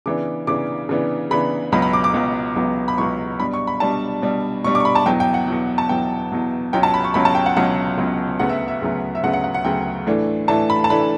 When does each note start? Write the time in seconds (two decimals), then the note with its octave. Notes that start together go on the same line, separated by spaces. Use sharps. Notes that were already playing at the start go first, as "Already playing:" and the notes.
0.06 C#3 E3 B3 D4 D6
0.47 C#3 E3 B3 D4 D6
0.89 C#3 E3 B3 D4
1.31 C#3 E3 B3 D4 B5
1.72 C#2 B2 F#3 B3 B5
1.82 B5
1.93 D6
2.04 D6
2.14 C#2 B2 F#3 B3
2.56 C#2 B2 F#3 B3
2.88 B5
2.98 C#2 B2 F#3 B3 C#6
3.39 B2 G3 D4 B5
3.53 C#6
3.67 B5
3.80 B2 G3 D4 A5
4.22 B2 G3 D4
4.64 B2 G3 D4 C#6
4.75 D6
4.80 C#6
4.85 B5
4.95 A5
5.06 E2 B2 F#3 G5
5.20 G5
5.34 F#5
5.48 E2 B2 F#3
5.78 A5
5.89 E2 B2 F#3 G5
6.32 E2 B2 F#3
6.73 C#2 B2 F#3 C#4 G5
6.83 A5
6.94 B5
7.04 C#6
7.14 C#2 B2 F#3 C#4 B5
7.25 A5
7.35 G5
7.46 F#5
7.57 C#2 B2 F#3 C#4 F#5
7.97 C#2 B2 F#3 C#4
8.39 D2 C#3 F#3 B3 F#5
8.49 E5
8.68 E5
8.82 D2 C#3 F#3 B3
9.15 E5
9.23 D2 C#3 F#3 B3 F#5
9.33 F#5
9.44 F#5
9.54 F#5
9.65 D2 C#3 F#3 B3 G5
10.07 A2 E3 A3 D4
10.48 A2 E3 A3 D4 A5
10.70 B5
10.84 A5
10.90 A2 E3 A3 D4 B5